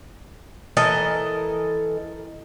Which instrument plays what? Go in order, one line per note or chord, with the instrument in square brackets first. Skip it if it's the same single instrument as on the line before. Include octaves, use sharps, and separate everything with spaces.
[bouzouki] E3 A4 A#4 D#5